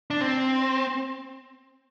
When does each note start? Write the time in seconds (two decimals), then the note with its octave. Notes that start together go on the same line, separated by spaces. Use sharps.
0.10 D4
0.21 C4